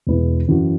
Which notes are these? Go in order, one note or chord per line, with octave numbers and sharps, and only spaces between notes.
E2 B2 G#3 E4 B4
F#2 E3 C#4 F#4